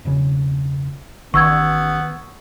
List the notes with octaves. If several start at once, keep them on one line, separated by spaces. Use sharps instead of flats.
E1 C#3
A1 D#3 B3 C#6 E6 G#6